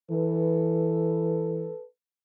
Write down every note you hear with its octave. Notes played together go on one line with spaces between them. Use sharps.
E3 A4 B4